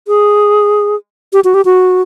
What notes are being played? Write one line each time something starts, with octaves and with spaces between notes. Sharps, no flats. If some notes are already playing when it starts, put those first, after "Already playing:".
G#4
G4
F#4
G4
F#4